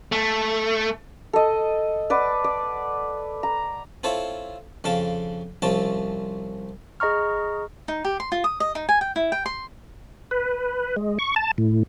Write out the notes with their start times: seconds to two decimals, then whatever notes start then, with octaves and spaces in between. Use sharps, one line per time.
0.12 A3
1.33 A4 D#5
2.10 B4 D5 F#5
2.44 D5
3.43 A#5
4.04 C4 E4 F4 A4 C5 C#5
4.84 F2 C#3 F5 G5 A5
5.62 C2 F3 C4 C#4 G5 A5
7.00 G#4 D#5 A#5 C#6 F6
7.88 D#4
8.04 G4
8.20 C6
8.32 F4
8.44 D#6
8.60 D#5
8.75 D#4
8.89 G#5
9.01 G5
9.16 E4
9.32 G5
9.46 C6
10.31 B4
10.96 G#3
11.19 C#6
11.36 A5
11.58 A2